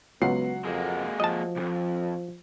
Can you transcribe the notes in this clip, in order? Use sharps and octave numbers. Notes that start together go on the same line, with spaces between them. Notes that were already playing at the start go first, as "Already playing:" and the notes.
C#2 F#3 B3 F#5 C7
F2 G#3 A#3
F3 D#5 A5
B1 F2